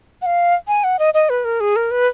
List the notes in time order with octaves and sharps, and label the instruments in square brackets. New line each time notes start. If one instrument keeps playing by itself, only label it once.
[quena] F#5
F5
G#5
F#5
D#5
D#5
B4
A#4
G#4
A#4
B4